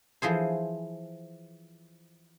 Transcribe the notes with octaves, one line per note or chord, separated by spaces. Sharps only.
E3 F3 G#4 C5